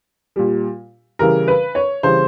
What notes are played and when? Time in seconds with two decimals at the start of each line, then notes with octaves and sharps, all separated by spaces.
0.36 A#2 G3
1.19 C#3 E3 G3 A#4
1.48 B4
1.75 C#5
2.03 C#3 E3 G3 C5